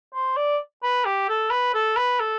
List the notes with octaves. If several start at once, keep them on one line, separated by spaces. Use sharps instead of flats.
C5
D5
B4
G4
A4
B4
A4
B4
A4